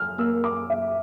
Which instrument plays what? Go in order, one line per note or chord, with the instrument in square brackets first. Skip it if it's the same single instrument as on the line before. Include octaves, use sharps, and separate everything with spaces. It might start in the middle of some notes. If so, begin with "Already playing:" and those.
Already playing: [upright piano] F6
[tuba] A#3 [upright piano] E6
[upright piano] D6
E5